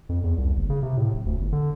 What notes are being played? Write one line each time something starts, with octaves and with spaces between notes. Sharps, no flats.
F2
E2
C2
F#1
C#3
C3
A2
D1
D2
G1
D3